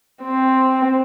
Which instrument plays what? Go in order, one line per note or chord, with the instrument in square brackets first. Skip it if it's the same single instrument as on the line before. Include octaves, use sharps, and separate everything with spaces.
[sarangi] C4